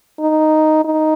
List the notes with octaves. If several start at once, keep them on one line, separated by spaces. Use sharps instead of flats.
D#4
D#4